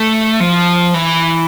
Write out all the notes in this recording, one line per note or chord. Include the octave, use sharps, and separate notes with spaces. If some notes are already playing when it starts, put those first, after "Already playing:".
Already playing: A3
F3
E3